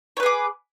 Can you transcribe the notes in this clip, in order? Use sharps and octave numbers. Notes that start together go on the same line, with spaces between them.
G#4 B4 C#5 D6